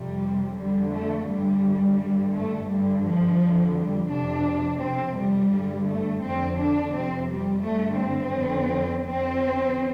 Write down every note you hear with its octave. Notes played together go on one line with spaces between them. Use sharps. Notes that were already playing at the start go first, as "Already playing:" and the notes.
Already playing: F2 C3 G3
F2 D3 G3
A3
G2 D3 G3
G2 D3
A3
G2 D3 G3
F3
F2 D3
G3
F2 C3 D4
F2 C3 C4
G3
G2 D3
A3
F2 D3 C4
D4
F2 C3 C4
G3
G2 D3 A3
C4
F2 D3
F2 D3 C4